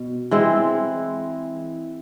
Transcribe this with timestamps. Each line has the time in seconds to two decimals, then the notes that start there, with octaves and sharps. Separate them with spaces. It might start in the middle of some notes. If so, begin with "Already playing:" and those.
Already playing: B2
0.31 E3 G#3 C4 E4